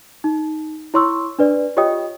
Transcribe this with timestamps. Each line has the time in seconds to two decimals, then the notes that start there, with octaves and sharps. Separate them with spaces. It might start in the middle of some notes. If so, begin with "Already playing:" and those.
0.24 D#4
0.94 E4 C#5 C6 C#6 E6
1.39 D4 B4 D5
1.77 F4 G4 C#5 D#5 G5 D#6